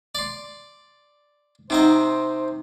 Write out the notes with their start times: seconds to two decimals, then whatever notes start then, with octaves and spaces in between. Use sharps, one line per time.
0.15 D5 C6
1.70 C3 C4 D#4 C5 D#5 F#5 A#5